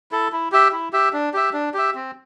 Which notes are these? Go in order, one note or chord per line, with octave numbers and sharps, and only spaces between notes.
E4 A4
E4
G4 E5
E4
G4 E5
D4
G4 E5
D4
G4 E5
C4